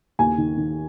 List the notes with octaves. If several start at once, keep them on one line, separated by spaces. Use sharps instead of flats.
D#2 G#5
D#3
D#3